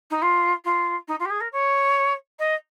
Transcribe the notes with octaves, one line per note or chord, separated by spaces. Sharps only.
D#4
F4
F4
D#4
F4
G4
G#4
A#4
C#5
D#5